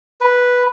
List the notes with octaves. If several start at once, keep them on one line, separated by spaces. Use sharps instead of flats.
B4